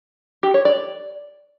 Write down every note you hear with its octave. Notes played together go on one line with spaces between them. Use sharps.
G4
C#5
D5